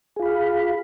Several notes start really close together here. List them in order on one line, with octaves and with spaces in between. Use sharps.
G#4 F4 B5 F5